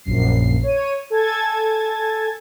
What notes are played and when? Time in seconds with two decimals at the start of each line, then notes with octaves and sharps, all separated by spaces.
0.04 A#1 F#2 C7
0.63 C#5 D#7
1.10 A4 G#5 A5 G#6 A6